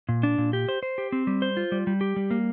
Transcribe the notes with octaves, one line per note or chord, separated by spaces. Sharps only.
A#2
D4
A#2
G4
C5
C5
G4
C4
G3
C5
F4
G3
G3
G4
G3
A#3